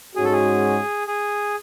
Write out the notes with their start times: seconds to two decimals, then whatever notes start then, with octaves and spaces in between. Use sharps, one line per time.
0.16 G#2 G#3 C#4 F#4 G#4
0.25 A4
0.32 G#4
1.07 G#4